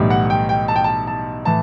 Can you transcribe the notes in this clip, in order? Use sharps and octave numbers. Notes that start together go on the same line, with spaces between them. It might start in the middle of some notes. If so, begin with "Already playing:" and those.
Already playing: B1 A2 E3 G3
F#5
G5
G5
A5
G5
A5
A5
A2 E3 A5